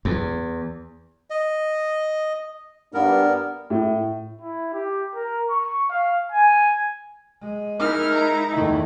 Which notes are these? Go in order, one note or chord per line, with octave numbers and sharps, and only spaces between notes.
E2
D#5
G2 B3 D4 A#4
A2
E4
G4
A#4
C#6
F5
G#5
G#3
D#4 E4 A#4 F6
A#5
E2 D#3 A3 D#4 E4